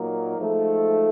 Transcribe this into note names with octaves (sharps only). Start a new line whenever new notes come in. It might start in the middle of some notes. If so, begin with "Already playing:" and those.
Already playing: A#2 F#3 A#3 D#4
G#2 F3 A3